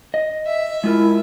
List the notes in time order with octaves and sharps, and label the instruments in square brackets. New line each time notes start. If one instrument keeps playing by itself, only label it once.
[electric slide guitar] D#5
[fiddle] E5
[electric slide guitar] G#3 F4 A#4 [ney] E4